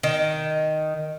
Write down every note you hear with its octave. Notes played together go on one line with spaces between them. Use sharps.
D#3